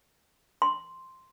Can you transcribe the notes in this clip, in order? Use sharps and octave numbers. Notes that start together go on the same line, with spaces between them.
C6